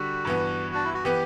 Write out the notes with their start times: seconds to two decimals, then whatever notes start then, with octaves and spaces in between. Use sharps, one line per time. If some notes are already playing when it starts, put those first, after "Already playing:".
Already playing: D3 G3 F#4 G4
0.25 G2 E3 B3
0.75 D4
0.84 E4
0.94 F#4
1.04 E3 B3 G4